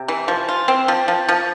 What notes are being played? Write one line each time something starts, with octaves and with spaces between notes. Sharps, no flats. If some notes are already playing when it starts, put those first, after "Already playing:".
Already playing: C3
E3
F3
F4
C4
F3
F3
F3